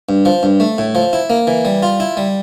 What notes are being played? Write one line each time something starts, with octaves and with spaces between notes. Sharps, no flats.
G2
F3
G2
A3
A2
F3
E4
A#3
E3
G3
F4
E4
G3